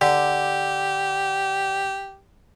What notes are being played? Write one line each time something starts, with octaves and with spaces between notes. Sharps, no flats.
D3 G4